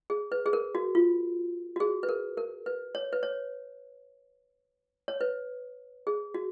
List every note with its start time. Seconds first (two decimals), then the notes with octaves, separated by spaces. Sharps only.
0.10 G#4
0.32 B4
0.46 G#4
0.53 A#4
0.75 F#4
0.95 F4
1.76 F#4
1.80 G#4
2.03 B4
2.09 A#4
2.37 A#4
2.66 B4
2.95 C#5
3.13 B4
3.23 C#5
5.08 C#5
5.21 B4
6.07 G#4
6.34 F#4